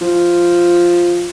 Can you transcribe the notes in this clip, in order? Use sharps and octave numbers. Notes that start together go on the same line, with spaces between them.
F3